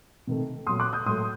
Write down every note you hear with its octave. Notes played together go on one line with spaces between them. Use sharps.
C3 D#3 A3
A#2 F#3 A3 C6 D#6
D6 F#6
D#6 G6
A2 F#3 A3 C6 D#6